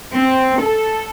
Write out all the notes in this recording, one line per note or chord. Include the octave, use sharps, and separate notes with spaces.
C4
A4